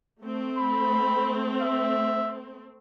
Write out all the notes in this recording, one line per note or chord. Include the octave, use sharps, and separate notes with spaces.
A3 C4
B5
E5